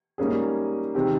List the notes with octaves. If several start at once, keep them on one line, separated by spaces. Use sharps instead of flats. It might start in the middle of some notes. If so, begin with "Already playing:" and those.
G#2 G3 A#3 C#4 G#4
C3 D#3 G#3 C4 G4